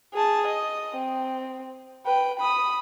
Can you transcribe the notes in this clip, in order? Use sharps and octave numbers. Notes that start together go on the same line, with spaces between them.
G#4 A5
D#5
C4
B4 G5
B5 D#6